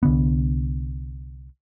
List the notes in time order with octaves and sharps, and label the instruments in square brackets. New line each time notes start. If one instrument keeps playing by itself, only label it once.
[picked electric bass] C2 D3 B3